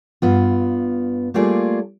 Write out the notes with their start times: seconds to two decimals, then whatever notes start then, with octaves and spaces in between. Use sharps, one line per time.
0.22 G2 B3 F4
1.34 G3 A3 A#3 F4 G#4 D5